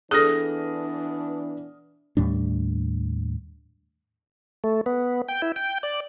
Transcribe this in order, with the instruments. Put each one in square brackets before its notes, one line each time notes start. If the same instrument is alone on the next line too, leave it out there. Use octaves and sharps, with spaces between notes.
[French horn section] E3 B3 D4 [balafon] G#4 A4 [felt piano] D#6 F6 A#6
[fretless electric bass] D#2 A2 G3 D4
[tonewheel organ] A3
B3
G5
E4
G5
D5